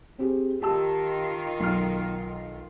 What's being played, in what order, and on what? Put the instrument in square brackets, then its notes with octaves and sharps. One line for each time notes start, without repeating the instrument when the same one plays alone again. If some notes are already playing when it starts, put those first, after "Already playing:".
[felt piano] C4 G4 G#4
[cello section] D#3 F4 [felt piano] G4 A5 E6
[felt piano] B1 F6